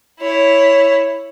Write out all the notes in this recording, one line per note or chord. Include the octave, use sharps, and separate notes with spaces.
E4 C#5